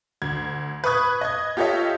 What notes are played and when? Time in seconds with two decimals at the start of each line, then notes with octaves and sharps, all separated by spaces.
0.22 D2 G#6
0.84 B4 B5 C#6 D#6 F#6 G#6
1.21 D#5 G#6
1.57 F4 G4 A4 C#5 D#5 E5